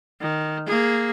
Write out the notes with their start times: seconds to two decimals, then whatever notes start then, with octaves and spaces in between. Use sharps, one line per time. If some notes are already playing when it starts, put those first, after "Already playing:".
0.21 D#3
0.67 A#3 G#4